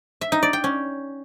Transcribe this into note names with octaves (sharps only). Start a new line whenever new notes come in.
E5
D#4
D5
G5
C#4